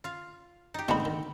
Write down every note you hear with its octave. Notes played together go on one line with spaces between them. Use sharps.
F4 F5
D#4 G4
G#2 B2 D3 C4 D#4 F5 B5
D#3